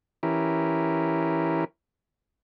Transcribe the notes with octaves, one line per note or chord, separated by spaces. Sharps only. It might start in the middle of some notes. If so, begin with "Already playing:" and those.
E3 C#4 E4 G4 A#4